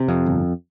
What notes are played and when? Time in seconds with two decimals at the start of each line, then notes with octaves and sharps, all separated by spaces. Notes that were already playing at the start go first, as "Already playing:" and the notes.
Already playing: C3
0.08 F2
0.26 G1